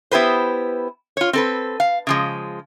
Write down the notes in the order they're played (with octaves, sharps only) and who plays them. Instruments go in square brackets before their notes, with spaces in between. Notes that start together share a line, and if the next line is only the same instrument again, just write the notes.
[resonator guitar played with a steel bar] B3 E4 G4 B4 C5
F4 C#5
C4 A4 B4
F5
C#3 F3 G#3